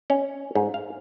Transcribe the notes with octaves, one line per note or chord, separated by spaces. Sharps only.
C#4
G#2
F5